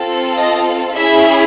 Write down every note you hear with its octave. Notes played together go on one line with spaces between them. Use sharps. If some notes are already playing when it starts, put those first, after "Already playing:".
Already playing: C4 F4 A4
D#5
C#4 E4 G#4 E5